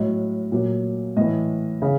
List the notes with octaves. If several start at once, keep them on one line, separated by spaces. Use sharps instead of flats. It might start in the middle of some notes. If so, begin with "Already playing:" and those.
Already playing: A2 F#3 D#5
A#2 F#3
A2 E3 D#5
C#3